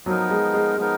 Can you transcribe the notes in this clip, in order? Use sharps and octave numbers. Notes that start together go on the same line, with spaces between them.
F3 F#3 B3 D#4 A#4
G#3
G#3
F3 G#3 B3 D#4 A#4